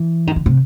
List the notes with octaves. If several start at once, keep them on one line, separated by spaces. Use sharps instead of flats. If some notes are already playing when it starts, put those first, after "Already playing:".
Already playing: E3
D#3
D3
C3